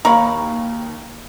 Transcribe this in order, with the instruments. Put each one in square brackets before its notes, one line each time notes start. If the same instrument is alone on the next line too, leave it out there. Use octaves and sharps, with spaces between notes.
[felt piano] D#2 F5 [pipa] A#4 C#5 B5